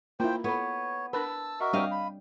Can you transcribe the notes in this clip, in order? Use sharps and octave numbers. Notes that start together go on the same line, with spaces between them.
A#3 E4 F4 C5 G5
B3 A4 C#5 B5
D4 A#4 B4 A5 B5 E6
F#4 A#4 D#5 E5
G3 C4 D4 G4 C#5 D#5 F5 G5
B5